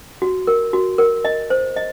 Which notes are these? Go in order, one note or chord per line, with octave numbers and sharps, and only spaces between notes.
F#4
A#4
F#4
A#4
D#5
C5
D#5